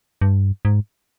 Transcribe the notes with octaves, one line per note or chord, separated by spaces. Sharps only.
G2
G#2